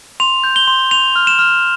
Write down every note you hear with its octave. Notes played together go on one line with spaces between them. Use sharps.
C6 F7
G6
G7
C6
C6 F7
F6
E7
F6